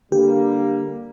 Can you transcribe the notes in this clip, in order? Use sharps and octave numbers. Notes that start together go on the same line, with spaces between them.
D3 G3 A#3 G4